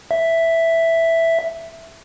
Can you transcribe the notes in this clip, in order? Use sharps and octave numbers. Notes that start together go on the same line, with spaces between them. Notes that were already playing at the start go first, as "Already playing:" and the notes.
E5